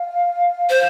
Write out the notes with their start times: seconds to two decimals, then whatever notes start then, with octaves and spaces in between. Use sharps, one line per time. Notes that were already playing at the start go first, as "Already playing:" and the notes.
Already playing: F5
0.70 C5